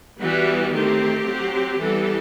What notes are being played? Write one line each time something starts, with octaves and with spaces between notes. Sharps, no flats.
E3 G3 B3 F#4
D#3 A3 C4 G4
F#3 C4
E3 G3 B3 A4